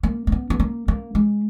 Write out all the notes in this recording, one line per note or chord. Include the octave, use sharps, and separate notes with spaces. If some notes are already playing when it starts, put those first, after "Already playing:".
A#3
A#3
B3
B3
A#3
A#3
G#3